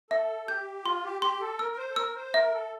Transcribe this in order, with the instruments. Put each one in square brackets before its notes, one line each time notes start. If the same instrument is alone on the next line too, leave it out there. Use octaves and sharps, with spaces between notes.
[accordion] A4 [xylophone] E5
[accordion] G4 [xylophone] G6
[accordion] F4 [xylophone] C6
[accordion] G4
[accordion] G4 [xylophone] C6
[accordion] A4
[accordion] A#4 [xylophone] E6
[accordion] A#4
C5
A4
[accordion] A#4 [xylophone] E6
[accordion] C5
[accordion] A#4 [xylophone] E5
[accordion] A4